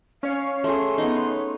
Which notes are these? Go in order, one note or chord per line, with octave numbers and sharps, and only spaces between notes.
C#4 C#5 F5
A3 G#4 C6
B3 D#4